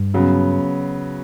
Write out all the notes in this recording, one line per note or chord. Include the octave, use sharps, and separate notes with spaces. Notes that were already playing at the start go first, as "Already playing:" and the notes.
Already playing: G2
C#3 F#3 B3